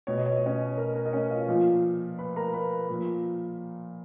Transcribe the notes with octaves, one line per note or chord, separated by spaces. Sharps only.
B2 C#5
D#5
C#5
D#5
C#4 C#5
A#4
A#4
D#5
C#4 C#5
F4 F5
A#2 F3
B4 B5
A#4 A#5
B4 B5
A#2 F3